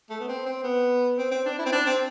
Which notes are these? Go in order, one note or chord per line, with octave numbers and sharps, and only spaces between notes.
A3
B3
C4
C4
B3
C4
C4
D4
E4
C4
D4
C4